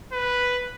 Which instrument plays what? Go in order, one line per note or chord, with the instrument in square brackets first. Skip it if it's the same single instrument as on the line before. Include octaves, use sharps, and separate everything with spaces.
[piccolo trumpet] B4